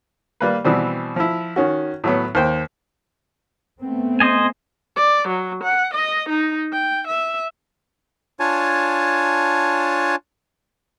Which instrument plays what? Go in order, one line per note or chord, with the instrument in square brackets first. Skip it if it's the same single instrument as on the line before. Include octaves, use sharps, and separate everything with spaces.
[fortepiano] G3 A#3 B4
B2 E3 G3 C4
F3 E4
D#3 C#4 F#4
A2 F#3 B3
D#2 C5 G5
[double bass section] A3 B3 C4
[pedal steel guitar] C5 D#5 G#5
[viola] D5
F#3
F#5
D#5
D#4
G5
E5
[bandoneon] D4 F4 C#5 G#5 A5